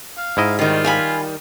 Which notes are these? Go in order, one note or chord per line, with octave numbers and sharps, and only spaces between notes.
F5
G#2 E4 D#5
D#3 G3 F4
F5 G#5 B5